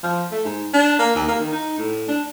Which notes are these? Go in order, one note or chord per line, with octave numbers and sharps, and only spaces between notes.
F3
A3
G#2
D4
A#3
D#2
A#3
D#3
D#4
A2
D4